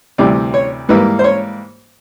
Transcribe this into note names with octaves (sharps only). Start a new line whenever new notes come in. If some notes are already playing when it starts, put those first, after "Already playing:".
D2 C3 E3 G3 D5
C#5
G#2 E3 G3 A#3 B4
C5
C#5